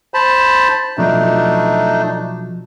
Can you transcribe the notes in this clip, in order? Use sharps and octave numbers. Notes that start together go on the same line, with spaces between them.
C5 A5 B5
B2 F3 F#3 A3 D4 D#4